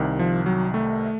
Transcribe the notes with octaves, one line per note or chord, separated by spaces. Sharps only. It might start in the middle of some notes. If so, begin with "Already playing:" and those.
Already playing: C2 C3 D#3
F3
F#3
A3